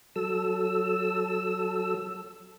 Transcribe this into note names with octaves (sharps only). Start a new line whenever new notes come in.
F#3 A4 E6